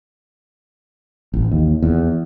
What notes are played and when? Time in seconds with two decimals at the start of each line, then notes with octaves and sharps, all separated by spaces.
1.34 A1
1.51 D#2
1.82 E2